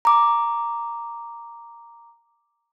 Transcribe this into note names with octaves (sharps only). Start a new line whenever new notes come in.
A#5 D6